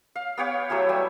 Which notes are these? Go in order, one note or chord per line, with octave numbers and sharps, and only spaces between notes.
F5
B3 G4 C#5 F5
F#3 A3 E4 G4
G3 G#5